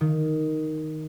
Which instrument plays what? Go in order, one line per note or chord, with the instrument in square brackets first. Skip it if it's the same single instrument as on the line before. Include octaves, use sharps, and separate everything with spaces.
[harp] D#3